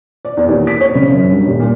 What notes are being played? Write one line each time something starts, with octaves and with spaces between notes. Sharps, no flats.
D5
E2
D#2
B6
C#5
C#3
F#2
G2
D#1
A#2